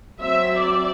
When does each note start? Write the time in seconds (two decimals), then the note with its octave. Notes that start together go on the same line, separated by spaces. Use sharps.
0.20 F#3 C4 E5
0.59 D5